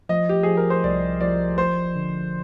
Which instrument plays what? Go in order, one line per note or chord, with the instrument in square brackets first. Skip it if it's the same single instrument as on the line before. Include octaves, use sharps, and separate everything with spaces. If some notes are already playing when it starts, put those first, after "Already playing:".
[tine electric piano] F3 [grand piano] D#5
[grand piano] G4
[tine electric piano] F3 [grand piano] G#4
[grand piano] A#4
C5
[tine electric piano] C2 [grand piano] D5
[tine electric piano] F3 [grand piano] D5
[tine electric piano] G1 [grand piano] C5
[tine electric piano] D3